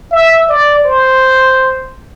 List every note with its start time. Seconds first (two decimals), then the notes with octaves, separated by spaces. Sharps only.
0.11 E5
0.49 D5
0.84 C5